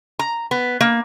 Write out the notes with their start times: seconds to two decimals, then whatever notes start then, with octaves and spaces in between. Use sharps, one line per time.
0.19 A#5
0.51 B3
0.81 A#3